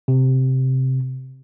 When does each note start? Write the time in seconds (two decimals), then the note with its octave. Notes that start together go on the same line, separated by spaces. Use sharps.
0.08 C3